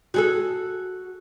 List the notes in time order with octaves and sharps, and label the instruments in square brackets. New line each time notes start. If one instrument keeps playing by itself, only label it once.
[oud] F#4 G#4 A4